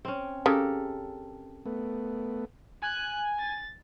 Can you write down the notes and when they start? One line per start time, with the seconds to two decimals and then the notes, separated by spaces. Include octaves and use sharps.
0.05 C4 C#4
0.46 C#3 G4 A4 A#4
1.66 A3 B3
2.82 G#5 F#6
3.40 A6